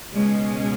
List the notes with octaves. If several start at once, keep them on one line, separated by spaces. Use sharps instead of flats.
C#2 B2 G#3 C#4